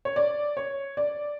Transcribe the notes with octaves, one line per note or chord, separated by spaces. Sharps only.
C#5
D5
C#5
D5